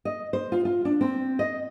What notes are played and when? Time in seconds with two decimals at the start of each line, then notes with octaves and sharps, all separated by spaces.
0.05 D#5
0.33 C5
0.52 F4
0.65 F4
0.85 D4
1.01 C4
1.39 D#5